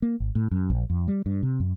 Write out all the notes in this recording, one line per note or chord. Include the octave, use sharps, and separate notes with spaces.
A#3
G#1
A2
F#2
A#1
F2
G3
G2
C3
F#2